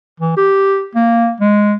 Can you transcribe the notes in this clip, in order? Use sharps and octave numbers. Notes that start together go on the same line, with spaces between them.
E3
G4
A#3
G#3